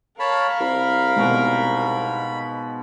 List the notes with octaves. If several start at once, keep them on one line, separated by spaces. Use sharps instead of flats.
A#4 C#5 F5 A5 B5
C2 B5
G#2 B2